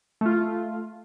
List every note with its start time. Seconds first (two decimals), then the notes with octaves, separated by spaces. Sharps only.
0.21 A3 F4